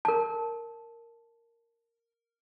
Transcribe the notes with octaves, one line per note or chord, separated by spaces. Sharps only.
A#4 A5